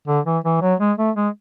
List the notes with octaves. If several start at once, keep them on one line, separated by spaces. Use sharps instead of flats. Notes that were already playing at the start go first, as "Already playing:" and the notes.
D3
E3
E3
F#3
G#3
A3
G#3